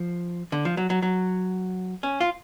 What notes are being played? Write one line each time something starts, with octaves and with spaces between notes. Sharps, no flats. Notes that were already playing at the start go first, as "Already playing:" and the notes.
Already playing: F3
D3
F3
F#3
F#3
F#3
C#4
F4